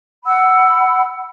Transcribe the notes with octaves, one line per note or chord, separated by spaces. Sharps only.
F#5 B5 E6